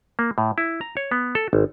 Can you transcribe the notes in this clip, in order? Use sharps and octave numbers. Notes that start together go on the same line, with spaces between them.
A#3
A2
E4
A#5
C#5
B3
A4
G#1